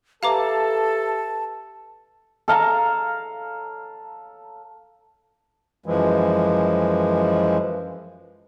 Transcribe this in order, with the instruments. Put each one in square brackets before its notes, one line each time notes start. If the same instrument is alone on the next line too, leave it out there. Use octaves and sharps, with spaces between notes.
[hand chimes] G4 B4 E5 [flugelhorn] A4 [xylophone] F5 A#5 D6 [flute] A5
[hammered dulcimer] A4 F5 A#5
[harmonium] F#2 E3 F3 G#3